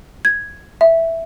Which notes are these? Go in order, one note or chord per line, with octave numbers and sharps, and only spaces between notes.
G#6
E5